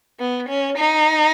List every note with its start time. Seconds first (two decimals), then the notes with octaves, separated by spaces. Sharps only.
0.19 B3
0.49 C#4
0.79 D#4